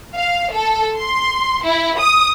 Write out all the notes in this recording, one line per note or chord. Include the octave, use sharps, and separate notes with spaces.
F5
A4
C6
E4
D#6